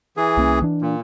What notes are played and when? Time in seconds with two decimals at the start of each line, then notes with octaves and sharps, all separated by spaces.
0.17 E3 G#4
0.37 C2 A#3 C#4
0.62 E3 D4
0.82 A#2